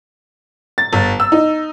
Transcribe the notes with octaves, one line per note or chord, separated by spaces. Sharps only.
A6
G1
E6
D#4